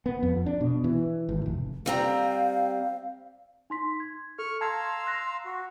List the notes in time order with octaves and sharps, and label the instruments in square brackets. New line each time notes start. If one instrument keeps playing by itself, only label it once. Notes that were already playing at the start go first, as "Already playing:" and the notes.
[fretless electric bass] B3
F2
D4
B2
E3
G#1
F1
[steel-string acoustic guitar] G3 C4 A#5 [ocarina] F5
[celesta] D#4 C6 B6
G#6
[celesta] A4 [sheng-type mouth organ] C#6 F6
[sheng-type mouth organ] F5 A#5 E6 [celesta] A5 G#6 [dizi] C6
[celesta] F#6 A#6
[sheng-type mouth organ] F#4